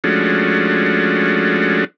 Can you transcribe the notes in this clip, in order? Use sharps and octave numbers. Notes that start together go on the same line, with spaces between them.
F3 G#3 A3 C#4 D4 F#4